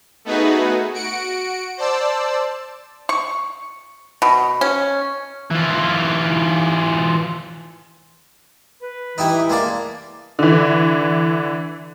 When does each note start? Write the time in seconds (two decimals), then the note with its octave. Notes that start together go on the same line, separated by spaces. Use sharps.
0.25 A3 B3 D#4 F#4 G#4 B4
0.94 F#4 C#7 D7
1.77 C5 D5 A5 E6
3.09 C#6
4.22 B2
4.61 C#4
5.51 E3 F4
8.81 B4
9.18 E3 D#4 E4 G4
9.49 F#2 C3 G#3 A#3 D5 A5
10.39 D3 E3